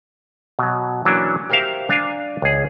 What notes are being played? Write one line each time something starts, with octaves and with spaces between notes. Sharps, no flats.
B2 F#3
E3 F#3 A#3 C#4 D4
G4 A#4 C5 E5 F5
D4 F5 G#5 A#5
C#2 G#4